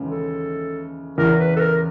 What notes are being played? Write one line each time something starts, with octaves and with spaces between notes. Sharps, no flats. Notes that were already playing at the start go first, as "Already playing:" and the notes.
Already playing: D#2 C#3 E3 G#3
A4
E2 C#3 E3 A#4
B4
A4
A#4